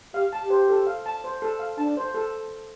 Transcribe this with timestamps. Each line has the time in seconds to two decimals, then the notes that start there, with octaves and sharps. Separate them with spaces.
0.13 G4 F5
0.33 A5
0.42 G4
0.50 C5
0.69 A4
0.87 F5
1.06 A5
1.24 C5
1.42 A4
1.59 F5
1.78 D4 A5
1.97 C5
2.14 A4